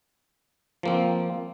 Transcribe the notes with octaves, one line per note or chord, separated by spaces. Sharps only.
F3 A#3 C4